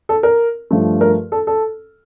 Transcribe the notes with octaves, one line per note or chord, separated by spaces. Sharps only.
A4
A#4
G2 F3 A3
A#4
A4
A4